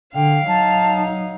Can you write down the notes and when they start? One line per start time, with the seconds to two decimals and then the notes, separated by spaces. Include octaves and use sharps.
0.14 D3 F5 G5
0.47 F#3 D#4 A5